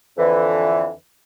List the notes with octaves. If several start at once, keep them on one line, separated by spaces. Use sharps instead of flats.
F2 D3 E3